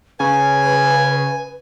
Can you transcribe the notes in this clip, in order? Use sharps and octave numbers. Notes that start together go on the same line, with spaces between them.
C#3 B4 G#5